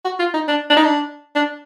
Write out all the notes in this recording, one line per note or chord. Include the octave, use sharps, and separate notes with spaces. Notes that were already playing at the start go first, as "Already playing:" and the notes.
F#4
F4
D#4
D4
D4
D#4
D4
D4